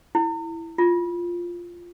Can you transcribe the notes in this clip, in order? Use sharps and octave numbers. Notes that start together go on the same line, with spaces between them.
E4
F4